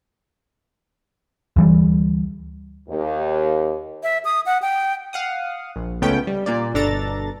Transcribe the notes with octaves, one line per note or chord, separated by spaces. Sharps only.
D2 E3 G3
D#2
E5
D#6
F#5
G5
F5 F#5 D#6
A#1
C#2 A3 B3 C#4 G5
G3
A#2 A#3 D5
G1 B2 D4 A4 A#5 A6